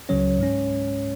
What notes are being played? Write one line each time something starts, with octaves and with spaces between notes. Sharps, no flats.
C#2 C#3 F#3 C#4 C#5
G#2 G#3 C#4